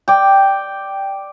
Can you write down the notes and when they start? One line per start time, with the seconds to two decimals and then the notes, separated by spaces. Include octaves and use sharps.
0.08 D5 G5